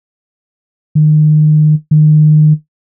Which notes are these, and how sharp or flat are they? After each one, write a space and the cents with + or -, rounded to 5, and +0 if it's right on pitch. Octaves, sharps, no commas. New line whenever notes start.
D#3 -30
D#3 -30